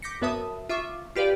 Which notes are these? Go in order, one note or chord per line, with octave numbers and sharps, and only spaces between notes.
D6 G6 A#6 B6 C#7
F#2 B3 B4 E5 A5 D#6
F4 E5 C#6 D6
F4 G4 B4 D5 F5 G5